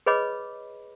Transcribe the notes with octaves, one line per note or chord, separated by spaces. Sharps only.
G#4 B4 C#5 D#5 B5 D6